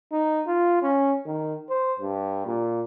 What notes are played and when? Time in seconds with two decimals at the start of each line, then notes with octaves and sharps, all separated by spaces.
0.12 D#4
0.47 F4
0.82 C#4
1.26 D#3
1.69 C5
1.99 G2
2.46 A#2